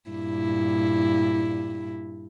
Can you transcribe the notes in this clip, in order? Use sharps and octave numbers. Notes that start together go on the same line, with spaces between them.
G2 A#2 E4